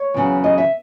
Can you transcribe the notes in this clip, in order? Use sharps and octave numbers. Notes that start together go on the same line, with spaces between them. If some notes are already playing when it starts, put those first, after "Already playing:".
Already playing: C#5
E2 C#3 F#3
D#5
E5